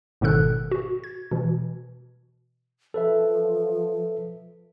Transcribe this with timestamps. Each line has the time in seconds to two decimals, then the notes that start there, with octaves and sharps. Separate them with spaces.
0.21 G#1 G#2 B2 D#3 A4 F#6
0.71 F#4
1.04 G#6
1.31 B2 E3
2.94 F3 A4 B4 E5